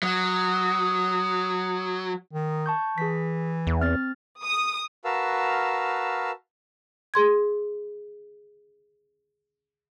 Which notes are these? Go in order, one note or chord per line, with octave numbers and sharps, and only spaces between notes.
F#3 D#6
D#3
A5 C#6 G6
E3 G#4 B6
E2
C4 F6 A6
D#6
F#4 A#4 B4 F5 A5 E6
G#4 C6 G#6